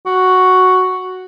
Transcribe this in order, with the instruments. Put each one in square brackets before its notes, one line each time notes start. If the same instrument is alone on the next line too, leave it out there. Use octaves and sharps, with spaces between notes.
[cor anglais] F#4